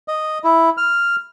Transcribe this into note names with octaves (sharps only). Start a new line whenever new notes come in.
D#5
E4
F6